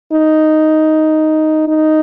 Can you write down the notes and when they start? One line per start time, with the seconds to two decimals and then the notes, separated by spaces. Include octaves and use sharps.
0.13 D#4
1.68 D#4